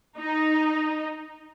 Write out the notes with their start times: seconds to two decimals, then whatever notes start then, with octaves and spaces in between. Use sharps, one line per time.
0.19 D#4